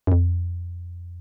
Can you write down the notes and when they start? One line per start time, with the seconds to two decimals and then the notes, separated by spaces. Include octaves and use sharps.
0.07 F#2
0.12 F2